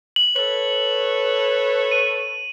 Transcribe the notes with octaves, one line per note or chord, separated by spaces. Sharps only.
F#7
A4 B4 C#5 F#7
D#7